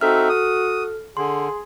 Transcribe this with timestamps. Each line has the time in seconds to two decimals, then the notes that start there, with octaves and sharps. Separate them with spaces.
0.01 C4 D#4 F#4 A4 E5 F6
0.29 D#6
1.17 D3 G#4 C6